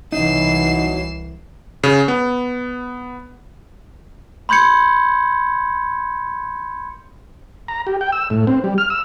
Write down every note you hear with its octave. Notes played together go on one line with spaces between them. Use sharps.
C2 B2 E3 F#3 D#4 C7 E7
C#3
B3
B5 C6 G6 G#6 C#7
A#5
G4
G5
E6
A2
C4
G3
F6
E6